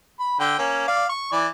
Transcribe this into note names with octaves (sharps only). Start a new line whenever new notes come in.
B5
D3 G5
A#3 C#4
D5 F5
C#6
E3 D5